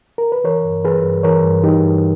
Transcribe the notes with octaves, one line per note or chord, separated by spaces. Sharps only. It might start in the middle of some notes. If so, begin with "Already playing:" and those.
A#4
B4
E3 A#4 C#5
G2
E3 G#4 B4
G2
E3 A#4 C#5
G2
E3 D#4 G4
G2